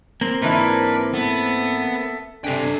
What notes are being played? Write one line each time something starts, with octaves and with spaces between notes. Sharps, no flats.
A#3 C4
G#2 E3 D4 E4 A#4 B4
B3 A4 E5
C3 D4 A4 G5 G#5